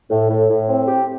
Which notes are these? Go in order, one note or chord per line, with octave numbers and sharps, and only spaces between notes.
A2
A2
A2
C4
G4